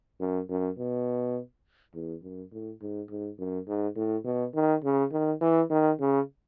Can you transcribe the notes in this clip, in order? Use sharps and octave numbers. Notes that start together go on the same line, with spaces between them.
F#2
F#2
B2
E2
F#2
A2
G#2
G#2
F#2
G#2
A2
B2
D#3
C#3
D#3
E3
D#3
C#3